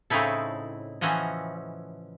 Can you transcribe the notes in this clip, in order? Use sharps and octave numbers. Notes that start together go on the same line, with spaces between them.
A2 C#3 C4 D#4 E4 A4
E3 F3 C#4 F#4 D#5